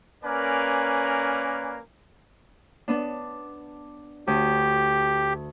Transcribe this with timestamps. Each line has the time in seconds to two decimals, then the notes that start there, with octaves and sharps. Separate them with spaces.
0.24 A#3 C#4 A#4 B4 D5 G#5
2.88 B3 D4
4.27 D2 G4